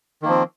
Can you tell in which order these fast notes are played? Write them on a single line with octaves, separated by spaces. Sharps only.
D#3 A#3 F3 C4